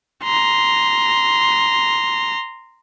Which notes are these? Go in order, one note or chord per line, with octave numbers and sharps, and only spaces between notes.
A#5 C6